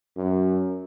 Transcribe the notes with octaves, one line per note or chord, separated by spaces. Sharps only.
F#2